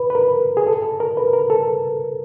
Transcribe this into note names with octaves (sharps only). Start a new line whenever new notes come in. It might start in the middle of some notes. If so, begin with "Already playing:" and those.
Already playing: B4
B4
A#4
G#4
A4
A4
A#4
B4
A#4
A4